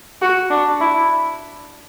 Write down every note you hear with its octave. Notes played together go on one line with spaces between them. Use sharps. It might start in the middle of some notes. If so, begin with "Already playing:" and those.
F#4
D4
E4